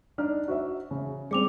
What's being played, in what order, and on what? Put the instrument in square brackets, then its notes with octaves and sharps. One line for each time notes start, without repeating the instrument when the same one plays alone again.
[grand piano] D4 D#4 F6
F#4 C5 E5
C#3
[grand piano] G3 C4 [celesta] G#4 D6 F7